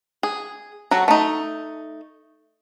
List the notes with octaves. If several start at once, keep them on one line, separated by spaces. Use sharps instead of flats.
G#4
F#3 F#4 A4
A3 D#4